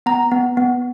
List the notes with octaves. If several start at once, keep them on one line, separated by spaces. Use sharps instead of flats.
B3 A#5
B3
B3